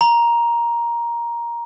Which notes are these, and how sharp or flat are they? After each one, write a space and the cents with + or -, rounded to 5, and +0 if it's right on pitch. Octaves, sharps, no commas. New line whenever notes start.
A#5 +10